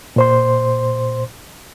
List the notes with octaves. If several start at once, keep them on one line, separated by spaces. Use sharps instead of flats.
A#2 C5 C6